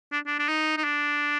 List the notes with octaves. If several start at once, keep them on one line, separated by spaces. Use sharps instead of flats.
D4
D4
D4
D#4
D#4
D4